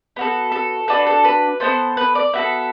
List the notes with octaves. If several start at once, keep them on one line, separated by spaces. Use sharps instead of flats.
B3 F#4 A4
A4
D4 F#4 A4 B4
A4
B4
B3 D4 A4 C5
B4
D5
B3 F#4 A4 E5